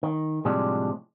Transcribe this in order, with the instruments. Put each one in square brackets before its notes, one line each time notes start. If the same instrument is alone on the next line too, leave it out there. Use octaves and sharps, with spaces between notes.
[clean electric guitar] D#3
A2 C3 F3 G3 G#3 D4